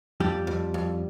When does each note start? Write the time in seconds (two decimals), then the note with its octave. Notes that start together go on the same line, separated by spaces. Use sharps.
0.20 F2 G3 G4
0.47 F2
0.74 F2